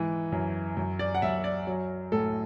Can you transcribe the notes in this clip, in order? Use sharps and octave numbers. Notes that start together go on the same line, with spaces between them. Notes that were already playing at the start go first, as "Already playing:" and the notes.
Already playing: G#2 E3
F#2
F#2
D5
F#5
F#2 E5
D5
F#3
A2 A4